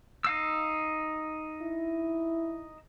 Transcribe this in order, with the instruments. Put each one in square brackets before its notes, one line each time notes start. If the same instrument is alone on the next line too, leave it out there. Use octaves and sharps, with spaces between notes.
[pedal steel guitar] D#4 F5 E6
[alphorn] E4